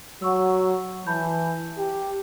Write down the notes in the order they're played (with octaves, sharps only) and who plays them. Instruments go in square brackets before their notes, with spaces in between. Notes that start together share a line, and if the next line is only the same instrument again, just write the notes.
[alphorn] F#3 [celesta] F#5 C#6 E6
[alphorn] E3 [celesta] A5 B5 G6
[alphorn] G4